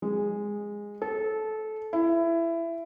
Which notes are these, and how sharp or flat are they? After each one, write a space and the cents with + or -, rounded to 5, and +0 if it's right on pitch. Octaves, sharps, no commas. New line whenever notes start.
G#3 -10
A4 -20
E4 +20